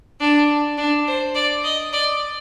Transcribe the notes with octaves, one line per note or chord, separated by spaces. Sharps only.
D4
D4
C5
D5
D#5
D5